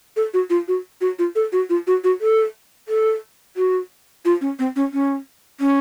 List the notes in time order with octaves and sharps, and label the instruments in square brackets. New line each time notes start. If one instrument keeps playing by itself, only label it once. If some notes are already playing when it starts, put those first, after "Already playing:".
[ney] A4
F#4
F4
F#4
F#4
F4
A4
F#4
F4
F#4
F#4
A4
A4
F#4
F4
C#4
C4
C#4
C#4
C#4